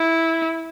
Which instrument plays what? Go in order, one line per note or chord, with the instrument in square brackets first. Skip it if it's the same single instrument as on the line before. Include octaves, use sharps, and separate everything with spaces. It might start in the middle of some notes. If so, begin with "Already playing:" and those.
Already playing: [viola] E4